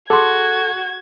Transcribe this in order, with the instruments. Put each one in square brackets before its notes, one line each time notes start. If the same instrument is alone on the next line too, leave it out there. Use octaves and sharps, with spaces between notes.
[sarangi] F#4 [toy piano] G#4 C6 [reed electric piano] A4 [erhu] G#6